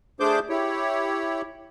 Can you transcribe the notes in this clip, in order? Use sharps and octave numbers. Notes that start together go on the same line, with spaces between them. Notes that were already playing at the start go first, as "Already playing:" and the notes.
A3 D4 G#4 C5 D6 G6
E4 G4 C#5